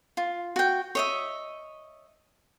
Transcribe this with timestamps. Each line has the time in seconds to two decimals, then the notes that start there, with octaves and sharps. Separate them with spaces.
0.17 F4
0.56 F#4 G5
0.95 C#5 D#5 E5